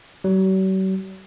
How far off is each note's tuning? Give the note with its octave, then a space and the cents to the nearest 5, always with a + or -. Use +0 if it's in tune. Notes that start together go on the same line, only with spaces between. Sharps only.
F#3 +45